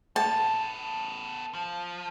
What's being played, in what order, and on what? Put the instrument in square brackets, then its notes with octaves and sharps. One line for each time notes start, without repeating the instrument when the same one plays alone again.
[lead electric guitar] B3 A4 [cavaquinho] A5
[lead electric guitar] F3